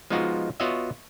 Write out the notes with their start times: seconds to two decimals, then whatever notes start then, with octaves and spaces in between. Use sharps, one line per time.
0.10 F3 G#3 B3 D#4 F4 F#4
0.60 B3 F4 F#4 C#5 D#5 E5